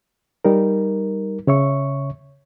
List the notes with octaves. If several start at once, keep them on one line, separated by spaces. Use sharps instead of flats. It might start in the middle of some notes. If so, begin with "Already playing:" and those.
G3 D#4 A#4
C#3 C#5 E5 C#6